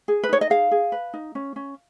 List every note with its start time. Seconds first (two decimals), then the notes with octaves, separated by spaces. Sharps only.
0.08 G#4
0.23 B4
0.29 D#4 C#5
0.41 D#5
0.50 G#4 F5
0.71 G#4
0.92 B4
1.14 D#4
1.35 C#4
1.56 C#4